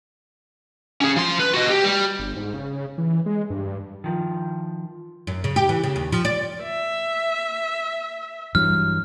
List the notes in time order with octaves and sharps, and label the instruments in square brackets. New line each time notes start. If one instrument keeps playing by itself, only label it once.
[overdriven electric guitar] C#4 G#4
F3 C6
B4
F#4 D#5
G4
G3
[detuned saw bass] G1
G#2
C#3
E3
G#3
G2
[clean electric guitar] D#3 F3
[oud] F#2
C#3
G4
E3
C#3
D#2
F3
D5
[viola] E5
[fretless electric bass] G2 E3 F#3 [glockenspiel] F6